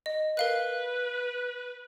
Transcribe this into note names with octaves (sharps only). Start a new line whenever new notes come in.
D#5
A#4 B4 F5 F#6